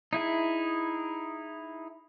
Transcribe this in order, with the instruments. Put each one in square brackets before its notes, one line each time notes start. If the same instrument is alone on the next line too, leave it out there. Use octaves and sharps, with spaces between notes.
[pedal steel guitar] D#4 E4 G#4